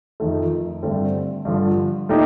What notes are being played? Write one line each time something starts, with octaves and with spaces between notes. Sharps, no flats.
F2 D#3 A3
G2 D3 A3 C4
G2 D3 F3
A#2 A3 D#4 G4